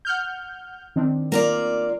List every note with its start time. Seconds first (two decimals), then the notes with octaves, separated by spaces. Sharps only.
0.05 F#5 F6 G6
0.96 D#3 C4 D4
1.32 A#3 F4 D5